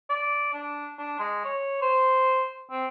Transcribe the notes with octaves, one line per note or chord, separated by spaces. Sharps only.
D5
D4
D4
G#3
C#5
C5
C4